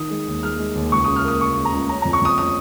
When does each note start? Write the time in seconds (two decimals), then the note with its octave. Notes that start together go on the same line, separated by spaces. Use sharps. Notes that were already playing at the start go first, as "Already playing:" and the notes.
Already playing: D#3 D#6
0.10 G#3
0.27 D#2
0.43 G#3 F6
0.59 G#3
0.75 D#2
0.92 C#2 C#6
1.04 C#3 D#6
1.16 F6
1.24 A#3 D#6
1.41 C#3 C#6
1.57 C#3
1.65 A#5
1.73 C#2
1.89 C#4 A#5
2.02 F2 A#5
2.13 C#6
2.21 F2 D#6
2.37 C#4 D#6